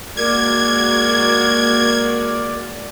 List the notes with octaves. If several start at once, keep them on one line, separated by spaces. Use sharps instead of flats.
G#3 A#3 F#4 A#4 D5 G#6